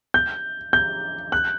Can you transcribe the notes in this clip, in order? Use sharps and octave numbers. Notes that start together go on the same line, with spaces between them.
G6
G6
F#6